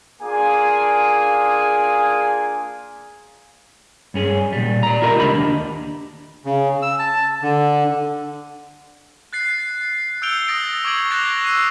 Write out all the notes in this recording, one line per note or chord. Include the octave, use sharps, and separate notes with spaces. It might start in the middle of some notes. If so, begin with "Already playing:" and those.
A#3 D4 F4 G#4 G#5 D6
G2 C#4 G#4
A#2 G3
D5 A#5
E4 F4 G4 A#4 D#5
C#2 D4 G4 D#5 B5
D#2 D4
C#3
E6
A5
D3
F#6 A6 C7
E6 G6 C#7 D7 F7 G7
D#6 A6 A#6 D7
C#6 D6 G#6 D7 F#7
F#6 A6 A#6 C7 E7 F7
E6 C7 D#7